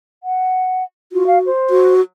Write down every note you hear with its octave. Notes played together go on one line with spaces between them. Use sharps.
F#5
F4 F#4
F5
C5
F#4